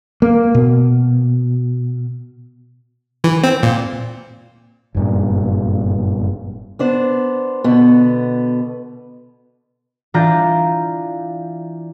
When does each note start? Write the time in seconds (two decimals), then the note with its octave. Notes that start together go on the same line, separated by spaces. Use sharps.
0.22 A#3
0.55 B2
3.24 E3
3.44 C4
3.63 A#2
4.95 F#1 G2 A#2
6.79 B3 D4 C5
7.64 B2 D3 B3
10.14 E3 D4 F4 A#5 G6 A6